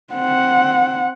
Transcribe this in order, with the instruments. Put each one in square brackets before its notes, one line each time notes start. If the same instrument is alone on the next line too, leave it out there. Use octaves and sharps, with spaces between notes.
[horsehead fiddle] C4 F#5